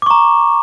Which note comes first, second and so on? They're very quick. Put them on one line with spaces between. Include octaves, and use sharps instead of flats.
D6 C#6 A#5